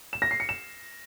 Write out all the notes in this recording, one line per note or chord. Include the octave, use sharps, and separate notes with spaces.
E7
A#6
C7
C#7
E7